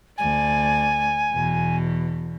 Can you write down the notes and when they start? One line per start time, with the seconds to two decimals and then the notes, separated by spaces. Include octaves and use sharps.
0.18 D2 D5 G#5
1.31 E2 B2